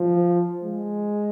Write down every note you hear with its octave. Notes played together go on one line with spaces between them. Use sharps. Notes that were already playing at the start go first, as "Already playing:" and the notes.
Already playing: F3
G#3